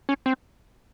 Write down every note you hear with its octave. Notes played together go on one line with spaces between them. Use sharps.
C#4
C4